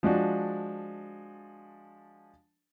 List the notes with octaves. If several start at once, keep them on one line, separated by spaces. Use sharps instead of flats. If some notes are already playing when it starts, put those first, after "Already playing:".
F3 G#3 D4 F#4